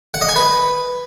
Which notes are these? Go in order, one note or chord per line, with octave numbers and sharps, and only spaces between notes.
F#5
D#5
G#5
B4